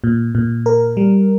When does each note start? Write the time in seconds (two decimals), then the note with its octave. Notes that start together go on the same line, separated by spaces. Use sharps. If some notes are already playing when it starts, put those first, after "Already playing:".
0.04 A#2
0.35 A#2
0.66 A#4
0.97 G3